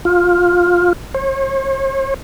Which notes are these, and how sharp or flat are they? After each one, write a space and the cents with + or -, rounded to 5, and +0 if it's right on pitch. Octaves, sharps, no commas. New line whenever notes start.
F4 +15
C#5 -45